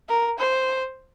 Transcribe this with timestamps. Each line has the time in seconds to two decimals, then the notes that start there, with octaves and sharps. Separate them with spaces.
0.09 A#4
0.38 C5